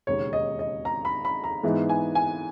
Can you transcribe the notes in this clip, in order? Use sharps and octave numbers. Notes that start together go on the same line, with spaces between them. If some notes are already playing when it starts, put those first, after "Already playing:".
E1 D#2 C#3 C#5
D#5
D#5
A#5
B5
B5
A#5
G#2 E3 G#3 B3 D#4
G#5
G#5